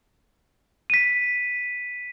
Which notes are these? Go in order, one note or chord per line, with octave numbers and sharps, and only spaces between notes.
B6 D#7